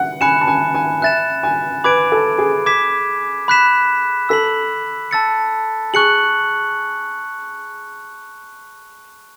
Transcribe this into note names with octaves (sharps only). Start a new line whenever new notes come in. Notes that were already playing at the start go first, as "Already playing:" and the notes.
Already playing: F#5
G#5 B5 F#6 C#7 E7
A5
G#5
G#5
E5 F#6 A6 E7
G#5
B4 B5 D6 G#6 D7
A4
G#4
D6 G#6 B6 E7
B5 F#6 B6 E7
A4 E6 B6 F#7
A5 E6 A6 C#7
G#4 C#6 F#6 C#7 F#7